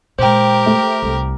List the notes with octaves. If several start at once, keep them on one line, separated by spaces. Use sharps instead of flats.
A#2 G#3 G4 A#4 C5 G5
A3
C2